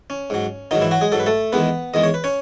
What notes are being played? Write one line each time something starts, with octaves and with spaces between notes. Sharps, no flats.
C#4
G#2 F#3
G#2 D#3 F#3 D#4
E3 E4
F#3 F#4
G#3 G#4
G#2 F#3 A4
B4
A3 A4
E2 D#3 G#3 B3 B4
E2 D#3 G#3 D#5
C#5
B4
C#4 C#5